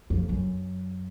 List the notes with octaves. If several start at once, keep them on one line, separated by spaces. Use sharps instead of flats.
F2
F#2